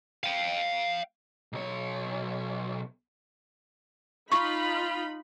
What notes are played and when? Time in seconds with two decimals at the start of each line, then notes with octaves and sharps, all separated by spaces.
0.24 F5 G5
1.53 B1 C#5
4.32 D#4 F4 B5 C#6